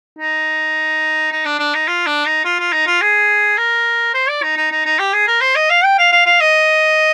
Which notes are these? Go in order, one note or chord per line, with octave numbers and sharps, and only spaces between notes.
D#4
D#4
D4
D4
D#4
F4
D4
D#4
F4
F4
D#4
F4
G#4
A#4
C5
D5
D#4
D#4
D#4
D#4
G4
G#4
A#4
C5
D#5
F5
G5
F5
F5
F5
D#5